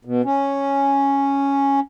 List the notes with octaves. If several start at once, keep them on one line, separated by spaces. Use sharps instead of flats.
B2
C#4